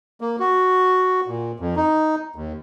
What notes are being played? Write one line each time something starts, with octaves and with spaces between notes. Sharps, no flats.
A#3
F#4
A#2
F2
D#4
D#2